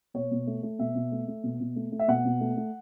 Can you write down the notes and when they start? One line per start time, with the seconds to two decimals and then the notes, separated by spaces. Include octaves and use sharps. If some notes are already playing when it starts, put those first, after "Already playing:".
0.14 B2 C#5
0.31 B2
0.47 A3
0.63 A3
0.79 B2 E5
0.95 B2
1.12 A3
1.28 A3
1.43 B2
1.60 B2
1.76 A3
1.92 A3
1.99 E5
2.08 B2 F#5
2.25 B2
2.41 A3
2.57 A3